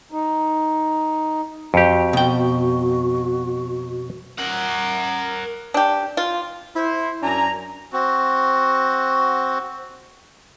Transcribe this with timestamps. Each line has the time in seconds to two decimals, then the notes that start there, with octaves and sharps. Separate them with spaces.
0.12 D#4
1.74 F2 F#4 G4
2.13 B2 G5
4.38 A#4 F#5
5.74 D4 G4
6.17 F4
6.76 E4 C5
7.23 F#2 D4 G#5 A#5
7.93 C4 F#4